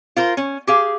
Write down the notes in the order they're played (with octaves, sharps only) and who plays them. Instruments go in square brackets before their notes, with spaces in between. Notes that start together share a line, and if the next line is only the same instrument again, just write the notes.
[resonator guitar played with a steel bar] F4 A#4 C5
C#4
G4 G#4 F5